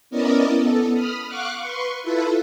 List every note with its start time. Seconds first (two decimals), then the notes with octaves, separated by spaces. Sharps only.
0.10 B3 C#4 E4 A#4 D5 D#5
0.56 B3 A4
0.93 B5 D#6 F6
1.27 F5 F#5 C#6 D6 F6 F#6
1.58 B4 C6 C#6
2.02 E4 F4 A4 B4